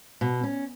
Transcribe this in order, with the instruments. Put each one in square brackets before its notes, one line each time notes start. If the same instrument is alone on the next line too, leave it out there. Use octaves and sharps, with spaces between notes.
[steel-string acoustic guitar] B2
C#4